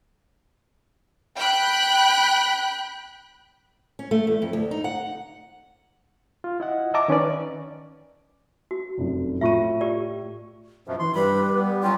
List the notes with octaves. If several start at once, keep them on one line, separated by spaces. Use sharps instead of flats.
G5 B5 F#6
C#4
A3
E2
F2
D2
D#4
F#5
F4
E4 D#5 F#5
D#5 E5 A5 A#5 D6
D#3 C#4 B4 D5
F#4
F1 F#2
A2 F4 E5 C#6 D#7
G4 D5
F#2 B2 F3 E5
E3 C6
G2 G3 B4 B5
B3
F#3 C#4 F4 G5